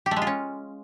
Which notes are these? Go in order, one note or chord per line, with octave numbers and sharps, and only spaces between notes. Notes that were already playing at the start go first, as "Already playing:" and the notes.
G4
A3
G#3
F4
C#4